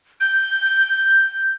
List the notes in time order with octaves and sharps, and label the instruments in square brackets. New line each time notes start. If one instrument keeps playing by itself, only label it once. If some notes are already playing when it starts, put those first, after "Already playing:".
[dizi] G6